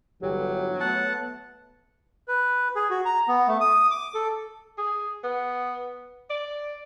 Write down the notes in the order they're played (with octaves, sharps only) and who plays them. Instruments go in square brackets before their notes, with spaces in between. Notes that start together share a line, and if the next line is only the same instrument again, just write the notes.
[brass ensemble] G1 E3 G4 [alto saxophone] F#3
[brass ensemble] A3 B3 [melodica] F#5 A5
[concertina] B4
G#4
F#4
A#5
B3
A3
D#6
D6
A4
[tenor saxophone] G#4
B3
D5